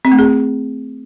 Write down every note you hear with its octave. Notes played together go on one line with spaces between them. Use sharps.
C4
A3
G#4